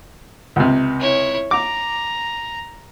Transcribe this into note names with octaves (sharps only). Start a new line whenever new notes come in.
C#2 C3
E4 C#5
A#5 D6